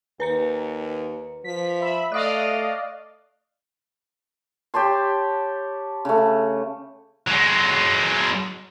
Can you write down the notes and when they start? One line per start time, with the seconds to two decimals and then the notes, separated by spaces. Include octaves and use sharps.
0.20 D#2 B4 A#5 C#7
1.44 F3 B6
1.81 E5 B5
2.12 A3 D5 D#5 F5 C#6 D#6 F#6
4.74 G4 C#5 A5 C6
6.05 C#3 A3
7.27 F#3 G#3